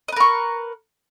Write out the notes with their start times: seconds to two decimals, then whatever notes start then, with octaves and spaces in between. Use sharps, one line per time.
0.08 D#5
0.12 B4
0.16 A#4
0.20 C#6